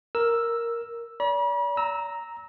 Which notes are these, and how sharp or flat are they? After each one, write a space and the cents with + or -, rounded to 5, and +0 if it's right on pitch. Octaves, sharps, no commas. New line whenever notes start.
A#4 +0 E6 +5
D5 -40 B5 -45
A#5 +0 E6 -20